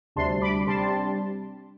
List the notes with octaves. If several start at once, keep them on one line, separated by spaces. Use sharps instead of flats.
D2 C3 G3 D4 A5 C6
B5 D6
C3 G3 D4 A5 C6